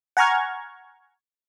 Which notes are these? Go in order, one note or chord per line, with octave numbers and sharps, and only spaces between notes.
F#5 G#5 A#5 C#6 F6 G#6